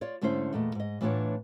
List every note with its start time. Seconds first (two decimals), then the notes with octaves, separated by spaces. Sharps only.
0.01 F4 C#5 D5
0.21 G#2 D3 A3 C#4 E4 C5
0.53 E2 A#2 A3 D#5
0.75 G#2 D#5
1.01 A2 E3 B3 D4 F4 C#5